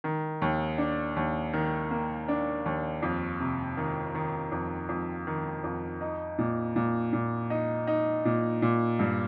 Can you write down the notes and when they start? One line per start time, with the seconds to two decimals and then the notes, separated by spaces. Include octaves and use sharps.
0.04 D#3
0.42 D#2
0.78 D4
1.16 D#2
1.53 D#3
1.91 A#3
2.28 D4
2.66 D#2
3.03 F2
3.40 C3
3.77 D#3
4.15 D#3
4.52 F2
4.89 F2
5.27 D#3
5.64 F2
6.01 D#4
6.38 A#2
6.76 A#2
7.13 A#2
7.50 D#4
7.87 D#4
8.25 A#2
8.62 A#2
8.99 G2